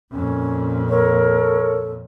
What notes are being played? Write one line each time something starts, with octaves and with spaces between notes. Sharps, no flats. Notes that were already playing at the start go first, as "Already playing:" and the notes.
F2 A#2 C#4
A4 A#4 C#5